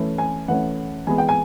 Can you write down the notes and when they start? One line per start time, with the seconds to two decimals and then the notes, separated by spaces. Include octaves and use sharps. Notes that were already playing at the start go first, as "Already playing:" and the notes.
Already playing: E3 A3 C#4
0.18 G#5
0.48 E3 A3 C#4 F#5
1.07 E3 G#3 B3 G#5
1.18 G5
1.29 G#5